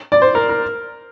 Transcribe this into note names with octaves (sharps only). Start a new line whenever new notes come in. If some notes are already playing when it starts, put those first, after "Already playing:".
D5
C5
A#4
A#4